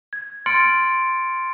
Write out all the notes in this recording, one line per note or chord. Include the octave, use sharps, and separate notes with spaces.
G#6
C6 F6 A6 C#7 D7